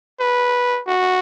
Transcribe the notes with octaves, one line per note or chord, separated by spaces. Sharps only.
B4
F#4